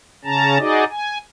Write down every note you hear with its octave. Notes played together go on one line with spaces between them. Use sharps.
C#3 C#4 A5 A#5
D#4 F#4 G#4 D5 D#5
G#5